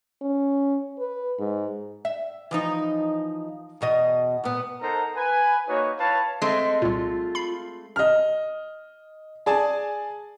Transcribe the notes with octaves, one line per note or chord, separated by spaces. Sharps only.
C#4
B4
G#2
E5
E3 F3 D#4
E2 B2 D#5
A#2 B3
D#4 A4 A#4 C5 F#5 A#5
B4 G#5
A#3 D#4 F#4 B4 C#5
E4 B4 C#5 F5 A5
G#3 A3 C4 D#5
C2 A#2 F4
F4
B5 C7
D#5 F6
G#4 D5 G#5 A5